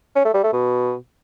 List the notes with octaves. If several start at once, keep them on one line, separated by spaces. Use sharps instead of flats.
C#4
A3
G3
A3
B2